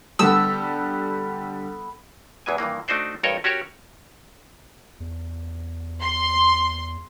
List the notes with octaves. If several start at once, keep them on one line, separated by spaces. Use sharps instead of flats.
D3 G3 B3 A4 E6
E2 E3 G#3 G#5
G2 D#3 E3 A#3
A3 D4 D#4 F#4 C5 D5
A1 G2 A4 A#4 C#5 D#5
C#4 F#4 G4 A#4 C#5
E2
C6